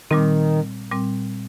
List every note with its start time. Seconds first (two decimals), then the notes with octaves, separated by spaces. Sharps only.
0.11 A#2 D#3 G3 C4
0.92 A#2 G3 C4